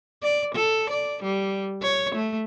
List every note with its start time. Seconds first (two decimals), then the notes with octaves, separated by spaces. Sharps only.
0.23 D5
0.55 A4
0.90 D5
1.24 G3
1.83 C#5
2.15 A3